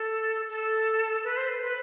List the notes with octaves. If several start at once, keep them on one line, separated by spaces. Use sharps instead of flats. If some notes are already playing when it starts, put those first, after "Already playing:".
Already playing: A4
A4
B4
C5
B4
B4